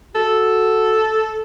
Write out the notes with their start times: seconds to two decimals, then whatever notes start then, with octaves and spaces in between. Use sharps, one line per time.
0.15 F#4 A4